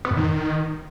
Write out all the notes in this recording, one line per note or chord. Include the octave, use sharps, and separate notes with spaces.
B3
F#2
D#3